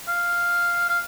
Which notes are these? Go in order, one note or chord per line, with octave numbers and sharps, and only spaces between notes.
F5
F5